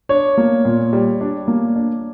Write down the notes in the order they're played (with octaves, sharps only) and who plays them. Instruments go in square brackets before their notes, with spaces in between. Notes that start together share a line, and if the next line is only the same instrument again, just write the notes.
[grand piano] D4 C#5
A#3
A#2
G3
D4
A#3
D4